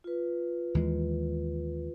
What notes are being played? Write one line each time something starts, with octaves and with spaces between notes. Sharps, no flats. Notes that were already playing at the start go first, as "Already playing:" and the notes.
F4 B4
D#2 E3 G#3